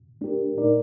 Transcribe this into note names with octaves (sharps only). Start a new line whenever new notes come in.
A3 D4 G4 A#4
A#2 A3 D#4 A#4 D5